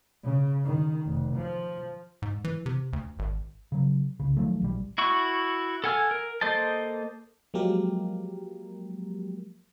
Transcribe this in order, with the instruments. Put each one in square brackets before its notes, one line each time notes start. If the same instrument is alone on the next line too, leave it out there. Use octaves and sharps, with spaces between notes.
[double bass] C#3
D#3
F1
F3
[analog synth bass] G#2
E3
C3
D2
G#1
[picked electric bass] C#3 F#3
C2 C#3
D#3 F3 F#3 A3
A#1 G3
[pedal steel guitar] E4 F#4 C#6
A4 F#5 G#5 F6
A#4
A#3 A4 C5 D#5 A5
[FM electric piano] F3 F#3 G#3 A#3 G4 A#4